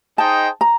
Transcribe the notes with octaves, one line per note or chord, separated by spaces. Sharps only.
D#4 G#4 C5 D#5 G5 A5
A#5